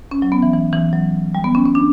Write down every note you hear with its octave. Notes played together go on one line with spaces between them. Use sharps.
C#4
F#3
B3
E3
E3
E3
F#3
G3
B3
C#4
C#4
D4